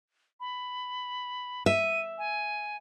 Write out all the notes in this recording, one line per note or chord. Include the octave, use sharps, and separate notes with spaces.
B5
E5 D#7
G#5